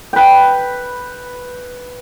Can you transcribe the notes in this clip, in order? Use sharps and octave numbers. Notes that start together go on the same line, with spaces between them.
B4 G5